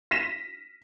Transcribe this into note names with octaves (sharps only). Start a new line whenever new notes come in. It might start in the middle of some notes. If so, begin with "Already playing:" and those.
A#6 B6 D#7 E7